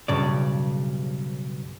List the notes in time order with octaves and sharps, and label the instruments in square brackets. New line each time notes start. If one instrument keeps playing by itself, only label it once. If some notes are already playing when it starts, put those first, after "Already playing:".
[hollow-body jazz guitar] B1 G2 C#3 D5